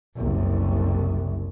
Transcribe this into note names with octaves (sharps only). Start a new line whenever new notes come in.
F#1 C2